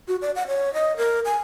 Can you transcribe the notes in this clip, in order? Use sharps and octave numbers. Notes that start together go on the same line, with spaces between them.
F#4
D5
F#5
C#5
D#5
A#4
G#5